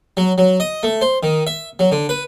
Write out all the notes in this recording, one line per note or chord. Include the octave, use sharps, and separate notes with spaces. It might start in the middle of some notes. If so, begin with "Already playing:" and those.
F#3
F#3
D#5
A3
C5
D#3
E5
F#3
D3
B4